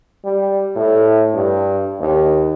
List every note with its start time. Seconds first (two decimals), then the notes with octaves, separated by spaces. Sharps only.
0.24 G3
0.76 A2
1.34 G2
2.00 D#2